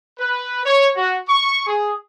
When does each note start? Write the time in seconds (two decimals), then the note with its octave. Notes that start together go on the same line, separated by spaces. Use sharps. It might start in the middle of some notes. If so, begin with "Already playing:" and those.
0.19 B4
0.65 C#5
0.96 F#4
1.29 C#6
1.67 G#4